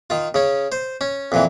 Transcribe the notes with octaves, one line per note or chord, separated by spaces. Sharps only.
D#3 F4
C#3 C#4
C5
C#4
F2 A#2 E3